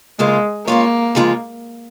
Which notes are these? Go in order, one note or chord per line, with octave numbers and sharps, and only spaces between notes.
C#3 G#3 A#3 F4 A#4
C#3 G#3 A#3 F4 C#5
C#3 F3 G#3 F4 G#4